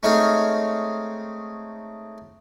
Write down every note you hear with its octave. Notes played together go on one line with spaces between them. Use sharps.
G#3 A3 C4 D#4 C#5 F5